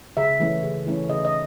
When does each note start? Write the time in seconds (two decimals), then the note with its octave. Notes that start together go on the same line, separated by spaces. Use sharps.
0.17 C#3 E5
0.40 E3 A3 C#4
0.63 C#3
0.86 E3 A3 C#4
1.10 C#3 D#5
1.25 D#5